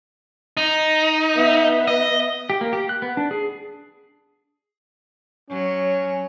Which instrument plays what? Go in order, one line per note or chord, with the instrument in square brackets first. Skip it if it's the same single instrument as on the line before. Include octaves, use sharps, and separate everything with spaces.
[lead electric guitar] D#4
[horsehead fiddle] B3 E5
[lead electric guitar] D#5
[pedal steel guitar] G4
A#3
G4
F#6
B3
D4
G#4
[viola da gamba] F#3 C#5 [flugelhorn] C#4